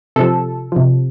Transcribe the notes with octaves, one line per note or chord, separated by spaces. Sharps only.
C3 F3 A4
C3 F3